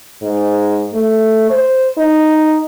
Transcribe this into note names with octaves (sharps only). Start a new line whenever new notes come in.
G#2
A3
C5
D#4